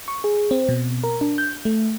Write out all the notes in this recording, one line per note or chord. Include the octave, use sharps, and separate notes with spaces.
C#6
G#4
C4
B2
A#4
D4
G6
A3